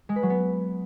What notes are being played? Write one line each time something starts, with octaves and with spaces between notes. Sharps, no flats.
G#3
B4
F#3
B3